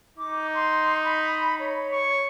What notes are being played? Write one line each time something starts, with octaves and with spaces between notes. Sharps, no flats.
D#4 D6
C6
B5
C#5
C#6